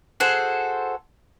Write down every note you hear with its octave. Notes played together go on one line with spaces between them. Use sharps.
F#4 G#4 A4 C5